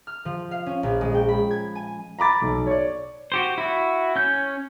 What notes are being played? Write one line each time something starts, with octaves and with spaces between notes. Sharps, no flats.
F6
F3
F5
C#4
A#1
G#3
G5
B5
G#6
G#5
A#5 B5 D6 A6
B1
C#5 D5
F#4 G4 C5
E4 F#4
C#4 G6